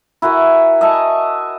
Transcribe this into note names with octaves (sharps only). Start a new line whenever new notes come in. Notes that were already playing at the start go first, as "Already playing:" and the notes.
E4 F#4 A#4 G#5
D#5 E5 G#5 A5